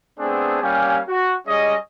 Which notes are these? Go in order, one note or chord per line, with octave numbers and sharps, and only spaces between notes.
A3 B3 C4 D4 G#4
G3 A#3 C#4 G4 F5 G#5
F#4
G3 C#4 G#4 D#5